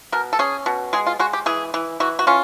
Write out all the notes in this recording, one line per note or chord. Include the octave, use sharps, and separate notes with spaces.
B2 A#4
A4
C#4 G#4
B2
G#3 G#4
F4
G#3 F#4
G4
E3 G#4
E3
E3 F#4
F#4
C#4 F4